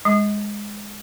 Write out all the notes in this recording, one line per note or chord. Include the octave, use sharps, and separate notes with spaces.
G#3